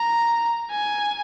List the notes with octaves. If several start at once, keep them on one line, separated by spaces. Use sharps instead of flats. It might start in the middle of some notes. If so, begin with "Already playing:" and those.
Already playing: A#5
G#5